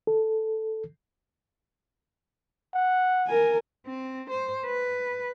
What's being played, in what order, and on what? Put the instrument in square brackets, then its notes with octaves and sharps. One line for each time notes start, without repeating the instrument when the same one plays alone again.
[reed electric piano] A4
[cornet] F#5
[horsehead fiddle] A#4 G#5
[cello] C4
C5
B4